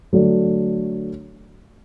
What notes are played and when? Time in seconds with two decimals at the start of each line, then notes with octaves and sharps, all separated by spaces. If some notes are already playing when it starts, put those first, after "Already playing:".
0.13 D3 F#3 A3 D4